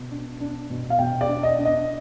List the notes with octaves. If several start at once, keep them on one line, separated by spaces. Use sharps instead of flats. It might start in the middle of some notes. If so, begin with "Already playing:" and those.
Already playing: B2
D4
D4
B2
F5
B2 G5
D5
D4
D#5
D4
D#5